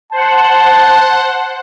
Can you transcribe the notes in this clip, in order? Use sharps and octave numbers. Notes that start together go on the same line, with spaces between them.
C5 F#5 A5